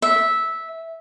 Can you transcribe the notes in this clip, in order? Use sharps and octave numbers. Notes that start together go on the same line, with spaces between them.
E5